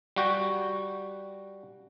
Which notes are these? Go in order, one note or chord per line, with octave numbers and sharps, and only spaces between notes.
G3 F#4 G5